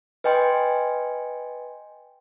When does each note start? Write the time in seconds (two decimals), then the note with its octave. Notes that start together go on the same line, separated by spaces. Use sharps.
0.24 B4 D#5 G5 G#5 C6